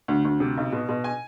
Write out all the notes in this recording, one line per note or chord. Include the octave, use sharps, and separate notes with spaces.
D2
D2
C3
B1
B2
B2
G#5